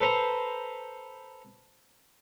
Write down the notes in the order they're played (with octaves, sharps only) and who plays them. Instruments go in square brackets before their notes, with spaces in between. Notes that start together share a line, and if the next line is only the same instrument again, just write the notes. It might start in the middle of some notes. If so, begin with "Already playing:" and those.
[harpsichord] A4 B4 C5 A#5